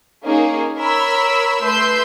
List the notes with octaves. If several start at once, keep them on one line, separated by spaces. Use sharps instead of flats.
A#3 C#4 D#4 G#4
A#4 C#5 B5 E6
A3 B4 C6 E6 G6